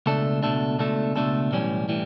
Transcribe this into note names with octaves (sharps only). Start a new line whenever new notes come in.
C#2 B2 A3 D4 A4
C#2 B2 A3 D4 A4
C#2 B2 A3 D4 A4
C#2 B2 A3 D4 A4
B1 A2 E3 G3 C#4
A2 E3 G3